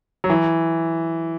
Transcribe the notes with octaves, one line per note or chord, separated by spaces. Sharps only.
F#3
E3